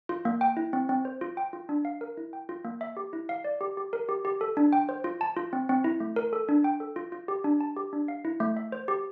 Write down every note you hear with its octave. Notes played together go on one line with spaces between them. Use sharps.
F4
A#3
G5
E4
C4
C4
C5
F4
G5
F4
D4
F5
A#4
E4
G5
F4
A#3
E5
G4
E4
F5
D5
G4
G4
A#4
G4
G4
A4
D4
G5
C5
F4
A5
F4
C4
C4
E4
A3
A#4
A4
D4
G5
A4
F4
F4
G4
D4
A5
G4
D4
F5
E4
A3
E5
C5
G4